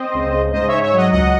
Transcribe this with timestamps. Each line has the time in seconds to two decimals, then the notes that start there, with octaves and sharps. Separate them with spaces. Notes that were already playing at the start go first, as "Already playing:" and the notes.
Already playing: C4 C5 D#5
0.14 C#2
0.33 C#3
0.53 G#2 C5 D#5
0.68 G#2 C#5 E5
0.83 C#5 E5
0.93 F#3 D#5 F#5
1.12 C#2 D#5 F#5